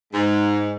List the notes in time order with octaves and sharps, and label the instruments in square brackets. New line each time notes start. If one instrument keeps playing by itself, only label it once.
[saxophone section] G#2